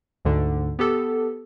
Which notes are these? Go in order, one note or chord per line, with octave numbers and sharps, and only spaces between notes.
D2 G#2 D3
B3 G4 A4